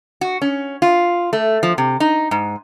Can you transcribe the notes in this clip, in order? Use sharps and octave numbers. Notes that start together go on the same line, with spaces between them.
F#4
C#4
F4
A3
F3
C3
D#4
G#2